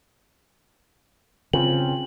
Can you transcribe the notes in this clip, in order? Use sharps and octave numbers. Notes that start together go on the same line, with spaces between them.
C#3 C4 F4 G5 F#7